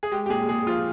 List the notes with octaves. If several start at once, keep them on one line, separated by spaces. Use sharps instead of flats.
G#4
G#3 G4
G4
A#2 G#4
A#2 G#4
F3 F4